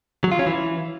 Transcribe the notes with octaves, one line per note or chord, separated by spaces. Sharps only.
F#3
F4
C#4
E3